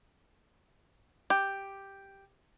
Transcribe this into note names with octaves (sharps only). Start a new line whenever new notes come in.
G4